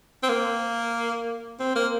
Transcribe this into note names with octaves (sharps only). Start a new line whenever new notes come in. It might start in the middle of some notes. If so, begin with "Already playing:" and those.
C4
A#3
C4
A#3